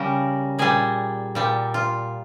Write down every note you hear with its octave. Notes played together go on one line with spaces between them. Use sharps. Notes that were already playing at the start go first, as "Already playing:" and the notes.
Already playing: C#3 G3 A#4
A#2 G3 G#4
A#2 G3
F4